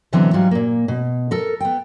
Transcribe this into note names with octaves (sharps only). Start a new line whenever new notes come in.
B2 D3 E3 F#3 B3 C4
G#2 F#3 G3 F4
A#2 A#3
B2
A4 A#4
B3 G5